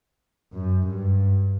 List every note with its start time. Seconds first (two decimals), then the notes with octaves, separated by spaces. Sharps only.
0.54 F#2
0.87 G2